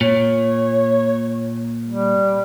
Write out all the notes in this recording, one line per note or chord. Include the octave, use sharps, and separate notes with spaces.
A#2 C#5
G3